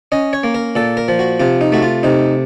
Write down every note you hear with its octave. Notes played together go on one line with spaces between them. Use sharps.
C#4 D#5
C#5
A#3
A#4
A#2 A4
A#4
F3
F#4
C3 F4
D#4
A3 F#4
F4
C3 D#4